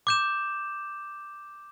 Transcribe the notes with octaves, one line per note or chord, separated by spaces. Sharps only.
D6 G6 E7